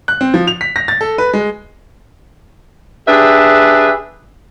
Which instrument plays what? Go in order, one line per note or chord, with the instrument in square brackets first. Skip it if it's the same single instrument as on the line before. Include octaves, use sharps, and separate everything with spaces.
[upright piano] F#6
C4
F3
F7
B6
A#6
A6
A4
B4
G#3
[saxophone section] D4 G4 G#4 B4 E5